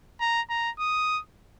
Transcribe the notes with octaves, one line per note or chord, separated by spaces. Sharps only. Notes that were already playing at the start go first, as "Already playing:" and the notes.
A#5
A#5
D#6